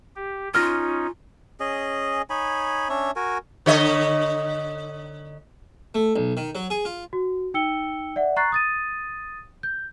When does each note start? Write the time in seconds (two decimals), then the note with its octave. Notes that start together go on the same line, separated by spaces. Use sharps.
0.16 G4
0.54 C#4 D#4 F4 F6 A#6
1.60 C#4 G#4 D#5
2.30 D#4 C#5 G#5 B5
2.89 C#4 D4 C#5 E5
3.16 F#4 A#4 G#5
3.66 D3 C#5 D#5
5.95 A3
6.16 B1
6.37 D#3
6.55 F#3
6.70 G#4
6.85 F4
7.13 F#4
7.54 D#4 G5 E6 C#7 G7
8.16 D5 E5 F#5
8.36 A#5 C#6 F#6 A6 C7
8.52 D#6 A6 D#7
9.63 G6